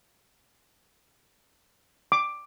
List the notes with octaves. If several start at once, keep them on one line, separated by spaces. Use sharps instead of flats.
D6